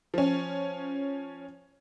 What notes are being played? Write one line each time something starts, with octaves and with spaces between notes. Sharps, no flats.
F3 C#4